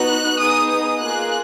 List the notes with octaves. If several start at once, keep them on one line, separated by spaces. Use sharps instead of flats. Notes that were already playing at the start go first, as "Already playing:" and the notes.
Already playing: B3 D#4 F#4 F#6
B3 D#4 G#4 D#6
D#6
A#3 F4 G#4 F#6